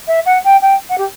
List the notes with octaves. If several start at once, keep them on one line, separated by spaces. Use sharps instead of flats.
E5
F#5
G5
G5
F#5
G4